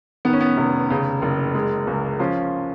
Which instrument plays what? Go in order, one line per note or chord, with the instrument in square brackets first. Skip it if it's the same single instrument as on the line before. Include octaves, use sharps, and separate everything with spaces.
[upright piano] D#3 B3
C#4
B3
F1
C#3
F#1
G#3
C#2
F3 C#4 F4